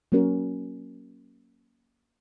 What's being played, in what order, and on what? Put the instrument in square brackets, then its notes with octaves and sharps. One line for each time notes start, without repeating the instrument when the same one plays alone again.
[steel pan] F#3 A#3 C#4 F#4 A#4